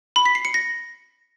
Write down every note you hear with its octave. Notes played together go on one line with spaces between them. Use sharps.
B5
B6
C7
C#7
A#6